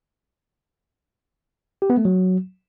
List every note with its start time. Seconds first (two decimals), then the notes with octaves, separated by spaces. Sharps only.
1.82 G4
1.90 B3
1.97 A3
2.05 F#3